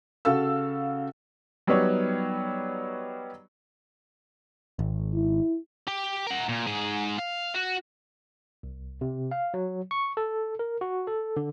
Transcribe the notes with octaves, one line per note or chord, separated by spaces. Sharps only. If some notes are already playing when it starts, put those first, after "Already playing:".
C#3 F#4 A4 F5 E6
F#3 G3 B3 D#4 B4 C#5
G#1
E4
G4
A#4 F#5
A#2
G#2 G#4
F5
F#4
C2
C3
F5
F#3
C#6
A4
A#4
F#4
A4
D3